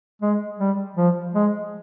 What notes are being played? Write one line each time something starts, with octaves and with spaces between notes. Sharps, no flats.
G#3
G3
F3
G#3